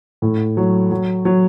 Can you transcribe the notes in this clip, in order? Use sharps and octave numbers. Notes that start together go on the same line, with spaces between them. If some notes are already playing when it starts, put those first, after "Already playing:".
A2
F#3
F#3
F#3